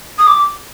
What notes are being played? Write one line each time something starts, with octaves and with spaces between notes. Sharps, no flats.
D#6
D6